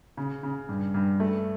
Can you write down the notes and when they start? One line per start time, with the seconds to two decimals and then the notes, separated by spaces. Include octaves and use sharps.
0.17 C#3
0.43 C#3
0.69 G2
0.94 G2
1.20 A3